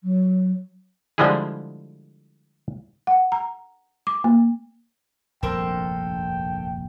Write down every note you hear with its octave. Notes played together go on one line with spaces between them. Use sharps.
F#3
D3 F3 G3 G#3 E4 G#4
F#5
A#5
D6
A#3
F1 A#1 G2 A4 A#4 C5 G5